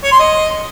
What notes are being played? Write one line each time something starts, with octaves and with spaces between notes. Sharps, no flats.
C#5
C6
D#5